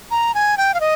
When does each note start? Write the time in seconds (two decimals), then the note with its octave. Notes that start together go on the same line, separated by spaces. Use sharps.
0.11 A#5
0.34 G#5
0.58 G5
0.74 F5
0.81 D#5